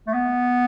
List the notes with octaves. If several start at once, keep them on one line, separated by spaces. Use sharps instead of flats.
A3
B3